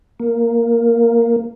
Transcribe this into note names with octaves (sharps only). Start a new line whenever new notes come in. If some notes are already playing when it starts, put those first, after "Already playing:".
A#3